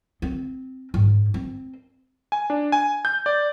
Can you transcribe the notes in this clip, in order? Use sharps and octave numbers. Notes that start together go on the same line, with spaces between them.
C4
G#2
C4
G#5
D4
G#5
G6
D5